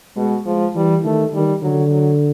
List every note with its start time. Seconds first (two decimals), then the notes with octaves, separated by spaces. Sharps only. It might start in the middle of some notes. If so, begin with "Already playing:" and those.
0.17 B2 G#3
0.46 F3 G#3
0.75 E3 G3
1.04 D#3 A3
1.33 D#3 G3
1.62 D3 F#3
1.91 F#3